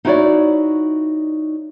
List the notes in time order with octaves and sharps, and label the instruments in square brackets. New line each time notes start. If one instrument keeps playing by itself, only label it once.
[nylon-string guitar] D#4 E4 F#4 A#4 C#5 D5